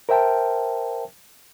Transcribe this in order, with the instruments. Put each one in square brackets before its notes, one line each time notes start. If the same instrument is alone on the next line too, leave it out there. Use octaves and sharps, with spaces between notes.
[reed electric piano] A#4 C5 E5 G5 A5